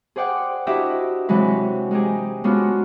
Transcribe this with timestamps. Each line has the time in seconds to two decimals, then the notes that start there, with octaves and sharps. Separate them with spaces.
0.16 G#4 C5 D5 F#5 G5
0.67 D4 E4 F#4 G4 D#5 E5
1.29 C3 E3 F#3 G#3 B4
1.91 G#3 D#4 G4 G#4
2.44 G#3 B3 C#4 D4 F4 F#4